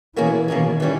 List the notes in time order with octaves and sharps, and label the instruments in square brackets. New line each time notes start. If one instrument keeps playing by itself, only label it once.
[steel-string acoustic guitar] B2 A#3 C#4 G#4 [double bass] E3
[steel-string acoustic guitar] B2 A#3 C#4 G#4 [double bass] D#3
[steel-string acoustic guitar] E3 G3 C#4